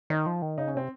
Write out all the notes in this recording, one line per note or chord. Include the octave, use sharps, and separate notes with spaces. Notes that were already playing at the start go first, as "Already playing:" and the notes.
D#3 D#4
F3
D#3
C#3 D#4
C#4
C3 C4